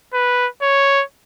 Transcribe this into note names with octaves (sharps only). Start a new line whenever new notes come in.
B4
C#5